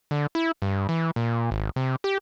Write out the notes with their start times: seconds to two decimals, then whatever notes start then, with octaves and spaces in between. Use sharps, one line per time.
0.11 D3
0.35 E4
0.62 G2
0.89 E3
1.16 A#2
1.51 G#1
1.76 C3
2.04 G4